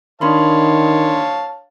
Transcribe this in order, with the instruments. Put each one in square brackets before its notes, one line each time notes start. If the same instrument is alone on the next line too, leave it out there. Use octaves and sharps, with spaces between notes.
[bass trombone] D#3 [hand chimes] D4 B5 C6 [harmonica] C#5 F5 A5